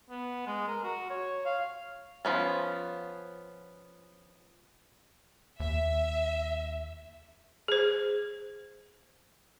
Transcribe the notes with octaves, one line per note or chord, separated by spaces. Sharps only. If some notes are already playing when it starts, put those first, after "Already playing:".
B3
G#3
A#4
F#4
C#5
F5
F3 B3 C#4
D#2 E5
G#4 C5